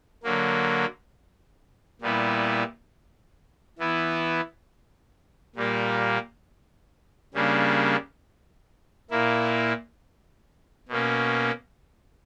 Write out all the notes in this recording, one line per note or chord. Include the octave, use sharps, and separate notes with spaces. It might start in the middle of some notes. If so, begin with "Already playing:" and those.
D3 F#3 A#3
A#2 G3 B3 E4
E3 B3 E4
A#2 G3 A#3
C#3 G3 A#3 D4
A#2 A#3 E4
B2 A#3 C#4